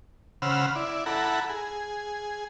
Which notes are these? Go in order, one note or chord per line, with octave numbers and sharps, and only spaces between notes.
C#3 C5 F#5 B5 E6 F6
E4 D5
E4 A4 F#5 A#5 B5
G#4